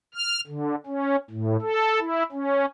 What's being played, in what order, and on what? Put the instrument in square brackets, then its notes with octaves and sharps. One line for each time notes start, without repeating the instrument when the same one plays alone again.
[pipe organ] F6
D3
C#4
A2
A4
E4
C#4